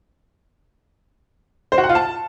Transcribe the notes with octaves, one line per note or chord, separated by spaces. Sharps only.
C5
F#4
F#5
F4
A5